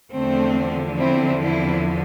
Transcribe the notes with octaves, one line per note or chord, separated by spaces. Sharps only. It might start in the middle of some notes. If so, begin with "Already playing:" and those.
E2 D3 F3 A3 C4
C4 E4
C4 E4